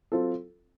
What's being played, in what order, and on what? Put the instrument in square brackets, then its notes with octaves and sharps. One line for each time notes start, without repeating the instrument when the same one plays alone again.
[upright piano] F#3 C4 F4 A4